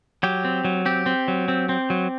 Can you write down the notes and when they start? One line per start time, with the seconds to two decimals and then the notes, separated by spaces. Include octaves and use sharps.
0.23 F#3 G4
0.45 C4
0.65 F#3
0.86 C4 G4
1.06 C4
1.28 F#3
1.48 C4
1.69 C4
1.90 F#3